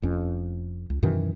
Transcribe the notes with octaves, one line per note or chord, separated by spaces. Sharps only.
F1 F2 C#4
C#2
F#2 B2 D#3 E3